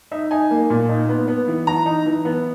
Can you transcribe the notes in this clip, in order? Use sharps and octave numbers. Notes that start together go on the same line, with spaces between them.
D#4 E5
D#4 G#5
A#3
A#2
D#4
B3
B3
E3
E3 A#5
D#4
E3
B3